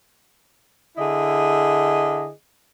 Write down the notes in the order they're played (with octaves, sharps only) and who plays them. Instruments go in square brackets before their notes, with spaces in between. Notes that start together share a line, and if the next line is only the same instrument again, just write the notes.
[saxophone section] D3 E4 G#4 D#5